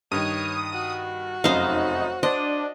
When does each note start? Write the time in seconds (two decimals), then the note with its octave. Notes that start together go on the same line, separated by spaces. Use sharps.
0.12 G2 D#3 C#5 D#6
0.73 F#4
1.44 F1 F#2 D#4 C5 F5
2.23 D4 C5 D#5